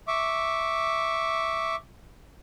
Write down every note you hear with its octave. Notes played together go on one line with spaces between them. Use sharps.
E5 C#6 D6